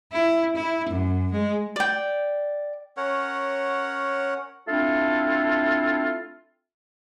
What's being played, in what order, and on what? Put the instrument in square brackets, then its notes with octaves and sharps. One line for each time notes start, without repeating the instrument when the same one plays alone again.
[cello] E4
E4
F#2
G#3
[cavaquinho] D5 G5
[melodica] C#4 A#4 C#5 F#5
[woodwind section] A3 C4 D4 E4 F4 A4